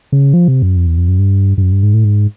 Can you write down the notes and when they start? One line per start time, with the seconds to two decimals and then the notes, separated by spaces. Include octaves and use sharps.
0.12 C#3
0.34 F3
0.48 C3
0.62 F#2
0.76 F2
0.87 E2
0.98 F2
1.08 F#2
1.19 G2
1.58 G2
1.62 F#2
1.72 G2
1.83 G#2
1.94 A2
2.05 G#2